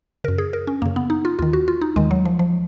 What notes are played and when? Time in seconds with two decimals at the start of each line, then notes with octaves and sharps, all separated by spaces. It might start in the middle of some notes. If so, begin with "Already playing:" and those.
0.24 F#2 C#3 A#4
0.38 G#4
0.53 A#4
0.67 C#4
0.82 F#2 C#3 A#3
0.96 B3
1.10 D#4
1.25 F4
1.39 D#2 D#3 F4
1.53 F#4
1.68 F4
1.81 D#4
1.96 D#2 D#3 G#3
2.11 F#3
2.25 F3
2.39 F3